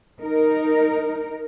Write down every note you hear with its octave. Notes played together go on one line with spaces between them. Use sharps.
D#4 A#4